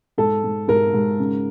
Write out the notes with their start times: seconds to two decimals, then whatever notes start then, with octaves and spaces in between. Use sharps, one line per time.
0.18 G#2 A4
0.43 G#2
0.68 G#2 A#4
0.93 G#2
1.19 C#3